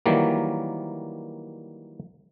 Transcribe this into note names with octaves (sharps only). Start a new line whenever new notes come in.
D#3 E3 F#3 G3 A#3